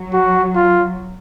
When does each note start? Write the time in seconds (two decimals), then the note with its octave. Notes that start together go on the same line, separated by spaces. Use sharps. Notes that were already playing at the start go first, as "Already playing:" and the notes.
Already playing: F#3
0.13 F#4
0.56 F4